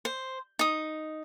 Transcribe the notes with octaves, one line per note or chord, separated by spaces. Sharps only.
C5
D#4 D#6